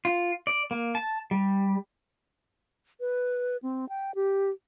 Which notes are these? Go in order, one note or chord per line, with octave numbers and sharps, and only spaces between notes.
F4
D5
A#3
A5
G3
B4
C4
G5
G4